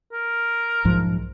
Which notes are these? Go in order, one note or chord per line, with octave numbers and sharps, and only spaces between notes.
A#4
B1 G#2 F3